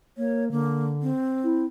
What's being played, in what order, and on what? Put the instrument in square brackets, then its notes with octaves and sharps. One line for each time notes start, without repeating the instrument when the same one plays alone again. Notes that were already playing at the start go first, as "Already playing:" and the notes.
[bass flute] A#3 [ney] C#5
[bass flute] D3 [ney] A#3
[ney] C4
[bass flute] E4